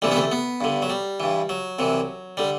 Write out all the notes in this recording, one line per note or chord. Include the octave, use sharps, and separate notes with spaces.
D2 C3 E3 G3
B3
A3
B3
G2 D3
F#3
G3
G2 E3
F#3
C2 C3 E3
D3 G3